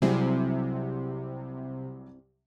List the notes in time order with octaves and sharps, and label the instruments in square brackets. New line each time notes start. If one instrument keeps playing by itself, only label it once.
[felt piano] C2 F#3 G3 [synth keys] C3 [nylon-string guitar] C4 E4 G#4